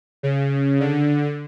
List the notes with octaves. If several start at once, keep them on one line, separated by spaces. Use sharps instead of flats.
C#3
D3